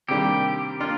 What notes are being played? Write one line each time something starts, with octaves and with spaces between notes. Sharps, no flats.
C3 D#3 G3 A#3 D4 G4
A#3 D4 F4